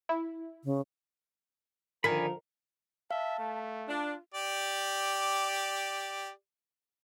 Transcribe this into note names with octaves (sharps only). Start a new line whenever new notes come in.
E4
C#3
D3 D#3 F3 A#4 D5 G#5 B5
E5 F5 A5
A3
D4 F4
G4 D5